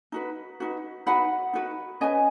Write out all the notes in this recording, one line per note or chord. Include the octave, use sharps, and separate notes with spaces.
D#4 F#4 B4
D#4 F#4 B4
D#4 F#4 B4 F#5 B5
D#4 F#4 B4
C#4 B4 D#5 G#5